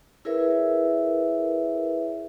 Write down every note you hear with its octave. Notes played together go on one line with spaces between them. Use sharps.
E4 G#4 A#4 B4 C#5 E5